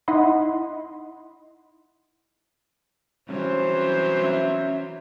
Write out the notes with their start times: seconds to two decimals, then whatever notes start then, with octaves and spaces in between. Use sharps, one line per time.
0.08 D#4 E4 D#5 F#5 B5 C6
3.29 C2 E3 F#3 C#4 C5
4.19 C#4 E5